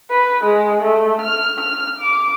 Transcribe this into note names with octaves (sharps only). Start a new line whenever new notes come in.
B4
G#3
A3
F6
F6
D6